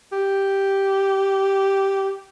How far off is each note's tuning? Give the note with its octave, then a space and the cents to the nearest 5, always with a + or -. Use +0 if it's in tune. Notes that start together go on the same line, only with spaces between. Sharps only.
G4 -5